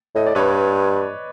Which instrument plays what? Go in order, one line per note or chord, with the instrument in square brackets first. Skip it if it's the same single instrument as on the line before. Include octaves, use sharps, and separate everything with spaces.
[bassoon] A2 [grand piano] D#5
[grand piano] D5
[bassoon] G2 [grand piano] B4 C#5